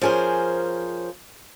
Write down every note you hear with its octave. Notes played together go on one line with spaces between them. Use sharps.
F3 C#4 G#4 A#4 C5